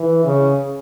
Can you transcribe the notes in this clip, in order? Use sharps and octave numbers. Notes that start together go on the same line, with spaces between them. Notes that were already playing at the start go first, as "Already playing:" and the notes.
Already playing: E3
C#3